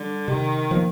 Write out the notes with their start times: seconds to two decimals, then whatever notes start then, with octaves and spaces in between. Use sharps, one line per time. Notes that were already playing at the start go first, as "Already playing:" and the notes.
Already playing: D3 G3 D4
0.28 C3 D#3
0.71 F3 A#3